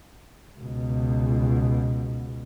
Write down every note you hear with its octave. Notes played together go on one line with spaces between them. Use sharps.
C#2 B2